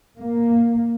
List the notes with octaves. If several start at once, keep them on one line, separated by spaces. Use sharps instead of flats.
A#3